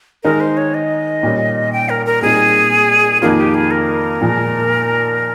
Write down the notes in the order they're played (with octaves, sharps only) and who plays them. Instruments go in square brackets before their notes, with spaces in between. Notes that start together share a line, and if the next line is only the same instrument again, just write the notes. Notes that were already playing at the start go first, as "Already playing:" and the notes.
[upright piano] D#3 G#3 D#4 [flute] A#4
[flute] C5
C#5
D#5
[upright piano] A#2 G3 C#4
[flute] G5
A#4
A#4
[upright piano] A#2 G3 C4 D#4 [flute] G#4
[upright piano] F2 D#3 A#3 F4 [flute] G#4
[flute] G4
G#4
A#4
[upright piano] A#2 F3 G#3